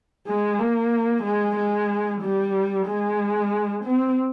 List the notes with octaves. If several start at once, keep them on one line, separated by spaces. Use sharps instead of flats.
G#3
A#3
G#3
G#3
G3
G#3
C4